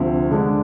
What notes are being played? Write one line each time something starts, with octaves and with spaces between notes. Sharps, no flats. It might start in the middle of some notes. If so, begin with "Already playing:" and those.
Already playing: D2 C3 F3 C4
D3 G#3 D4